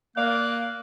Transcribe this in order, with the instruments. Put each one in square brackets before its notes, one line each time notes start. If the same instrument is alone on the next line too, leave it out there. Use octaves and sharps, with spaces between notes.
[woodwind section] A#3 [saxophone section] D5 F5 [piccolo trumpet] F#6